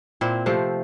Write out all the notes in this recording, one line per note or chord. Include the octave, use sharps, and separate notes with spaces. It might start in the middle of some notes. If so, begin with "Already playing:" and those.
A#2 C4 E4
C3 F3 A3